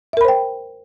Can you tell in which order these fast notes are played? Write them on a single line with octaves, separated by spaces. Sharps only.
E5 A#4 B5 C5 G5